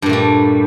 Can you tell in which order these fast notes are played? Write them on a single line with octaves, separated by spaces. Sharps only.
G2 A#2 A3 G3